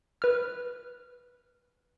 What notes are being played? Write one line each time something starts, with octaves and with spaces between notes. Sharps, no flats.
B4 F6